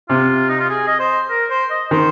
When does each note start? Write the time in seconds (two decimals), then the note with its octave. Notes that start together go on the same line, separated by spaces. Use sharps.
0.09 C3 F4
0.49 D#4
0.60 F4
0.70 G#4
0.88 D#5
1.00 C5
1.30 A#4
1.50 C5
1.71 D#5
1.91 D#3 C5